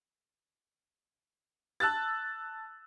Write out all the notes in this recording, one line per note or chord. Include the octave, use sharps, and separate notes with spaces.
A5 E6 F#6 A6